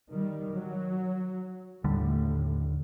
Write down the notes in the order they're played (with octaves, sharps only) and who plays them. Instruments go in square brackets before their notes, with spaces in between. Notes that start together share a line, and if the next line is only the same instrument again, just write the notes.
[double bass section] D#3 G3
F#3
[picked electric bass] D#2 D3 G3 [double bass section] A2